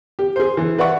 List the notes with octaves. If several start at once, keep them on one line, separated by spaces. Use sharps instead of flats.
G4
G#4 C5
E3
B4 D5 E5 F#5 C#6